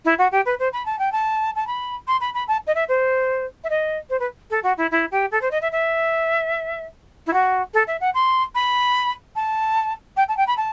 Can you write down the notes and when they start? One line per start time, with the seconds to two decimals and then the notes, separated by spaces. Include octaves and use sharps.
0.05 E4
0.18 F#4
0.32 G4
0.45 B4
0.59 C5
0.73 B5
0.85 A5
0.99 G5
1.12 A5
1.55 A5
1.67 B5
2.07 C6
2.21 B5
2.34 B5
2.48 A5
2.67 D#5
2.75 E5
2.88 C5
3.64 E5
3.70 D#5
4.10 C5
4.20 B4
4.50 A4
4.63 F#4
4.77 E4
4.91 E4
5.11 G4
5.31 A4
5.41 C5
5.51 D#5
5.61 E5
5.72 E5
7.27 E4
7.33 F#4
7.74 A4
7.87 E5
8.01 F#5
8.14 C6
8.55 B5
9.36 A5
10.17 G5
10.28 A5
10.37 G5
10.47 B5
10.57 A5